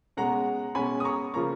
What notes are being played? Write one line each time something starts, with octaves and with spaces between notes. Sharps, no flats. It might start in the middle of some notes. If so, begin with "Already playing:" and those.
B2 G#3 C#4 F#5 A#5
B2 G#3 C#4 G#5 B5
D#6
A#5 C#6
C#3 F3 A#3 A#5 C#6